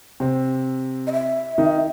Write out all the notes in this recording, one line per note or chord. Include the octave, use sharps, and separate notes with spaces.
C3 C4
D#5
E5
D#3 D#4